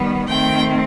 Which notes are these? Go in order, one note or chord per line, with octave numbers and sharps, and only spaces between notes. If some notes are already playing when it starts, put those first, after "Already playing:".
Already playing: D#3 G3 B3
D#3 A3 C4 G5